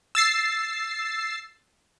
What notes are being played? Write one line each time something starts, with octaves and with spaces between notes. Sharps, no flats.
E6 A6 C7